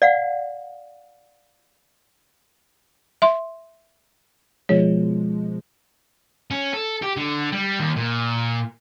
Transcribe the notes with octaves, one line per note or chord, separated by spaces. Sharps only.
D5 F5 F#5
E5 C6
B2 F3 G#3 C#5
C#4
A4
G4
D3
G3
D#2
A#2